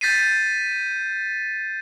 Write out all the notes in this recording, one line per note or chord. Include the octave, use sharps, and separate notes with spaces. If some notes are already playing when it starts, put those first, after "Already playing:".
G6 A6 B6 C7 D#7